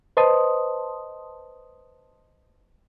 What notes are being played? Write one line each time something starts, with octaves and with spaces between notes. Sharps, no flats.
B4 C5 D#5 A5 C6 D#6